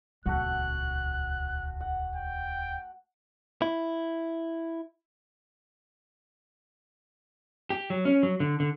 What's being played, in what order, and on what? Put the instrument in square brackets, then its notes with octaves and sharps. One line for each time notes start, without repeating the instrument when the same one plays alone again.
[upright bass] D#1 C#2 [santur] A3 F#4 F#5 [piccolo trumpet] F#6
[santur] F#5
[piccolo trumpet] G5
[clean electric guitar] E4
[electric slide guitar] G4
F#3
C#4
F#3
D3
D3